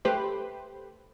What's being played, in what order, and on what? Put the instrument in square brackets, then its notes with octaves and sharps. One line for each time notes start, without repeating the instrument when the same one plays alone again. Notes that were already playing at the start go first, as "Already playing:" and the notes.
[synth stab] A3 G4 B4 C5